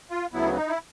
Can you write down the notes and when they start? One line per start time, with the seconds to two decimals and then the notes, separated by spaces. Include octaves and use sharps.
0.11 F4
0.33 D2 C#3 F#3 B3 E4
0.56 D#4
0.68 E4